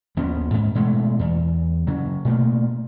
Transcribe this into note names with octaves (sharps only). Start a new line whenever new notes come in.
D#2 F3 B3 C#4
G#2
B2 G#3 A3
E2
C#3 F#3
B2 A3 A#3